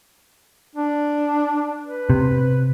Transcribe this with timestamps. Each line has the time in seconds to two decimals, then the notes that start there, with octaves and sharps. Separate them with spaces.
0.76 D4
1.86 B4
2.10 C3